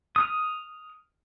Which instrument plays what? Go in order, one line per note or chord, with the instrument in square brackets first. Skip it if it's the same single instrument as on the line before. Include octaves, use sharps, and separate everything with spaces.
[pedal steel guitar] D#6 F6